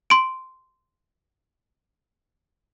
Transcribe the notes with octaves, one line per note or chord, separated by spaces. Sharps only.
C6 D7